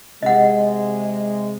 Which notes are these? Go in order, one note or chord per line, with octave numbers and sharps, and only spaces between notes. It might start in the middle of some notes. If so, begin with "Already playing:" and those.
C3 G#3 D#5 F#5